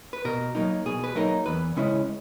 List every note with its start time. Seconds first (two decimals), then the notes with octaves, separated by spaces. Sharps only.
0.13 B4
0.25 B2 A#4
0.55 F#3 A#3 D#4
0.86 B2 G#4
1.04 B4
1.15 F#3 A#3 D#4 A#4
1.46 E2 B4
1.76 C#3 G#3 C#4 E4